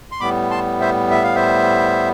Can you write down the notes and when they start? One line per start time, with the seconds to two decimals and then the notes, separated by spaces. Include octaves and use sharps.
0.12 C6
0.20 A2 G3 B3 B5 D6
0.51 A5 C6
0.81 C5 E5
1.11 E5
1.23 F5
1.35 C5 E5